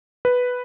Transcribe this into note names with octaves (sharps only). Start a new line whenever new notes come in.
B4